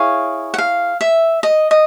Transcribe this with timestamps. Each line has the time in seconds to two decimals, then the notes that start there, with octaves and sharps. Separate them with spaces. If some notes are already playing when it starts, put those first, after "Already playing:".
Already playing: E4 G#4 C#5 F5
0.54 F#5
0.58 F5
1.01 E5
1.43 D#5
1.71 D#5